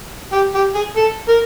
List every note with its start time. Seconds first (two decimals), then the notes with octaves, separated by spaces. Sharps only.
0.33 G4
0.55 G4
0.75 G#4
0.96 A4
1.28 A#4